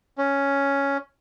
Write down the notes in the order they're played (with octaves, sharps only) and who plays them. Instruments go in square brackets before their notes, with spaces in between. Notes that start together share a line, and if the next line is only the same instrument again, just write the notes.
[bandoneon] C#4